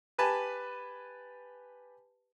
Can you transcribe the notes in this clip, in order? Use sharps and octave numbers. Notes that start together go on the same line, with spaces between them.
G4 B4 G#5 A5